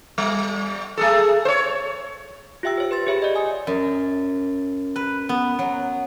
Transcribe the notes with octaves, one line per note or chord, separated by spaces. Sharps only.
G3
A3 G#4 A4
C5 C#5
F4 G4 E5 G5 E6
C5 C#5
B4 C6 A6
G4 G#4 C#5 E5 B5
D5 D#5
G#5 D#6
F#2
B4
B3
F#3